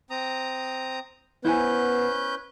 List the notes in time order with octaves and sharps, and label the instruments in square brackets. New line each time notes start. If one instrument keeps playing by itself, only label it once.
[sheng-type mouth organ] C4 A#5 D#6
[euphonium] B3 [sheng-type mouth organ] C#4 B4 G6 [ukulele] E4 C5 G#5